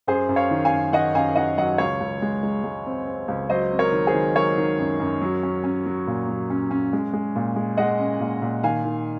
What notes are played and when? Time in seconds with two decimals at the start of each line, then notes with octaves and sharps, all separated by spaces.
0.07 F#2 G#4 C5
0.29 F#2
0.36 C#5 F5
0.51 D#3
0.65 F5 G#5
0.72 F#2
0.93 D#3 D#5 F#5
1.14 F#2 F5 G#5
1.36 D#3 D#5 F#5
1.58 F#3 D#5 F#5
1.78 C#2 C#5 F5
2.00 C#2
2.22 G#3
2.43 G#3
2.64 G#3
2.86 C4
3.07 C4
3.28 C#2
3.50 F#3 C5 D#5
3.72 C4
3.79 A#4 C#5
3.92 D#3
4.07 G#4 C5
4.14 D#3
4.36 F#3 A#4 C#5
4.58 D#3
4.79 F#2
5.00 F#2
5.21 F#3
5.43 C#4
5.64 C#4
5.86 F#3
6.07 A#2
6.28 F#3
6.50 C#4
6.71 C#4
6.93 G#3
7.13 G#3
7.36 A#2
7.56 G#3
7.77 G#3 D#5 F#5
7.99 C#4
8.20 A#2
8.42 A#2
8.63 D#3 F5 G#5
8.84 D#3